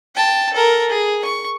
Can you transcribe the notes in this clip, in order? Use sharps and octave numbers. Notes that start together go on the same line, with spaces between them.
G5 A5
A4 A#4
G#4
C#6